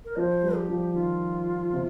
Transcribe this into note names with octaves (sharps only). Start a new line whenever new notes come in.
A#4
F3 D#5
C5
G3
G4
F3
D#3 F4
C3